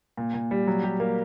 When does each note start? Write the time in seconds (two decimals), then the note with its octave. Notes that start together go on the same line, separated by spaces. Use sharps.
0.17 A#2
0.34 A#2
0.51 G3
0.67 F#3
0.83 G4
1.00 A#3